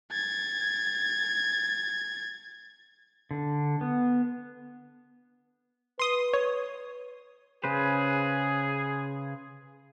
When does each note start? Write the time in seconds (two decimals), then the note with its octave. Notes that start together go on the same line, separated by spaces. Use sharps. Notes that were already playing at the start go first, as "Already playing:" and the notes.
0.12 G#6 A6
3.31 D3
3.81 B3
5.99 B4 C6 D#6
6.34 C#5
7.64 C#3 G#4 B4 C5